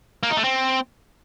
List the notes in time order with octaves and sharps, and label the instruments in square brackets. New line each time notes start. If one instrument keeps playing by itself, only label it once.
[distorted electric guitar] A#3
D#4
A3
C4